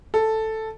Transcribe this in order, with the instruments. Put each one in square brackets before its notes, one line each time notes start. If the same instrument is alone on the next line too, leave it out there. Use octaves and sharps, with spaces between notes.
[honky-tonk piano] A4